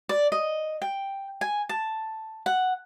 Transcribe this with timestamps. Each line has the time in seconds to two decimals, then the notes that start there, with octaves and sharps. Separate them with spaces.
0.09 D5
0.32 D#5
0.82 G5
1.41 G#5
1.69 A5
2.46 F#5